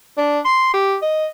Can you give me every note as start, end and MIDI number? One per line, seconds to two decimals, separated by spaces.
0.18 0.39 62
0.45 0.69 84
0.74 0.96 67
1.02 1.26 75